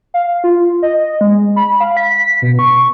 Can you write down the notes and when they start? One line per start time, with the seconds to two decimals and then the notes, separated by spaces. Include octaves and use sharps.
0.14 F5
0.44 F4
0.82 D#5
1.21 G#3
1.56 B5
1.81 F5
1.97 B6
2.42 B2
2.59 C#6